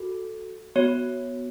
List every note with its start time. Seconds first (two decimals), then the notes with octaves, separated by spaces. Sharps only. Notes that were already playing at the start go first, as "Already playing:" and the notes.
Already playing: F#4 A4
0.76 B3 F#4 C#5